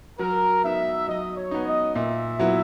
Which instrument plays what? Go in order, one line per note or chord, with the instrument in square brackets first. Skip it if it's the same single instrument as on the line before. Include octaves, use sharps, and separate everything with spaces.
[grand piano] F#3 [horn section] A#4
[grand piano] B3 D#4 [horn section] E5
[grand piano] F#3 [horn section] D#5
[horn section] C#5
[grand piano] B3 D#4
[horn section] D#5
[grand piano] A#2 [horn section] E5
[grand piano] F#3 B3 E4